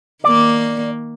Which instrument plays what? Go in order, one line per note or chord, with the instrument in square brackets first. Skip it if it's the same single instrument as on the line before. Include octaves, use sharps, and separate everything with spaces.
[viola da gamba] D#3 A#3 [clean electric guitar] D5